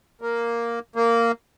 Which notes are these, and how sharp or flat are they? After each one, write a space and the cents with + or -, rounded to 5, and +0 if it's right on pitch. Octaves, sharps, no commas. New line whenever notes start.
A#3 +0
A#3 -10